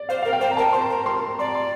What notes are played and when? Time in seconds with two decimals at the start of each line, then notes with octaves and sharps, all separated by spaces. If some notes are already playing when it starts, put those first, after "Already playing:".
Already playing: D5
0.09 C5 F5
0.22 A#4 F5
0.33 G5
0.41 C5
0.51 A#5
0.57 A#4 A5
0.73 C5 C6
0.81 A#5
0.90 A#4
1.05 A#4 C6
1.39 D5 C6
1.55 C6